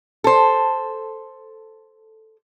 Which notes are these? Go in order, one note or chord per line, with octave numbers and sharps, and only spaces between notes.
A4 C5